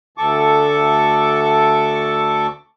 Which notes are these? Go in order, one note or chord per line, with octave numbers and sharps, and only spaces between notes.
D2 A4 C#6 D6